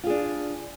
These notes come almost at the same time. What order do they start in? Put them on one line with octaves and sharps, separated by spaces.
F4 G#4 D4